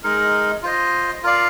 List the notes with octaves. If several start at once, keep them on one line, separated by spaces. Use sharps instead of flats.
G#3 D#4 A#4
F4 C5 D#5
F4 A#4 D5 F5